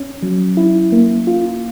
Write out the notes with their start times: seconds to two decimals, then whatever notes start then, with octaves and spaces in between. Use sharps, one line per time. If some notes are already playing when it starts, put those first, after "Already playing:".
Already playing: C#4
0.23 F#3
0.57 E4
0.92 A#3
1.27 F4